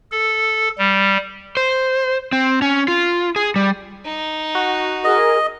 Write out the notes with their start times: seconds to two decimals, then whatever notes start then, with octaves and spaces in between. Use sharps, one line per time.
0.12 A4
0.78 G3
1.57 C5
2.33 C4
2.62 C#4
2.88 F4
3.36 G#4
3.56 G3
4.05 D#4
4.55 F#4
5.04 G#4 A#4 D#5